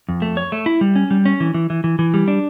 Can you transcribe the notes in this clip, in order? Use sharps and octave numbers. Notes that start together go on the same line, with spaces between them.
F2
A3
C#5
A3
E4
G3
C#4
G3
C#4
E3
E3
E3
E3
E3
G3
D4